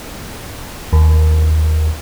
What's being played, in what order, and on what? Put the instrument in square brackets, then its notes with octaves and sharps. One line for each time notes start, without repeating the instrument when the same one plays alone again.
[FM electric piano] D#2